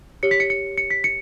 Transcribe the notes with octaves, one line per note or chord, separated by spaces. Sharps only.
G4 C#5 C#7
B6
C#7
C#7
C#7
B6
C#7